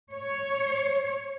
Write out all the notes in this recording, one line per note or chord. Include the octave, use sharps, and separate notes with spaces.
C#5